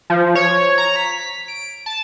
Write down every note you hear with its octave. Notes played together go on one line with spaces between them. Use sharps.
F3
C#5
A#5
B6
D7
A5